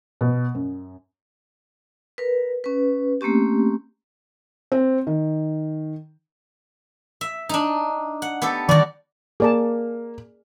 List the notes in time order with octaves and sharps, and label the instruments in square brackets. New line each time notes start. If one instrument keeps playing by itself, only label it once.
[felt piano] B2
F#2
[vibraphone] A#4 B4
C#4 B4
A3 A#3 C4 C#4 G4
[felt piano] C4
D#3
[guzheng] E5
D4 D#4
F#5
B3 G4 A4
[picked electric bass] D#3 E3 [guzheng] G3 F#4 [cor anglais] D5
[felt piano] A#3 [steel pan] G#4 D5 A5